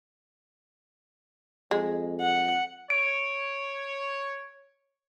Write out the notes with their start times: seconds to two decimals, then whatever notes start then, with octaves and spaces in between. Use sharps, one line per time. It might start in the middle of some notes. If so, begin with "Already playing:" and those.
1.71 F2 G#3
2.21 F#5
2.90 C#5 D7